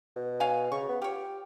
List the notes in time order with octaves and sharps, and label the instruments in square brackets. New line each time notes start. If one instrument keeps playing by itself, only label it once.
[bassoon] B2
[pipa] C#5 F5 G#5
[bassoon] C#3 [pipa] C#6
[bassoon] B3
[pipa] F4 C#5 [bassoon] G4